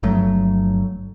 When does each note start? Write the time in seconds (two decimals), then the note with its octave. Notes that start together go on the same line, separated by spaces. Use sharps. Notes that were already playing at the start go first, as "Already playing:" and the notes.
0.03 G1 F3 F#3 A3